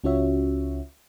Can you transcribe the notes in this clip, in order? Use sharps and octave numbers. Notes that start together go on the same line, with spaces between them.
C#2 C#4 F4 F#4 C#5 E5